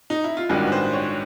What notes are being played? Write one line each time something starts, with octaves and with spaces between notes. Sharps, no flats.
D#4
E4
F4
A1 G2 D#3 G#3 F#4
B4
C5
C#5